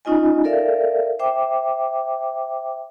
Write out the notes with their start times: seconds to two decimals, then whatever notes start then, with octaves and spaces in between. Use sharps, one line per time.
0.05 C#4 D#4 F4 D#5 G#5
0.44 A4 A#4 D5 E5 F5
1.19 C5 E5 G5 D6